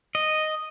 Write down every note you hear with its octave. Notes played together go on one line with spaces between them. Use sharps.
D#5